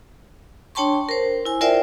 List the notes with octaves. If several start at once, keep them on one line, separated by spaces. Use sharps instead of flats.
D4 C#5 G5 A5 C6 C#6
A#4 C5
E4 G#5
F4 A#4 C5 D5 E5 G5